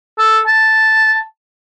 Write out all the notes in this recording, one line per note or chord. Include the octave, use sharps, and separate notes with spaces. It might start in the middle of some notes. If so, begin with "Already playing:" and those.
A4
A5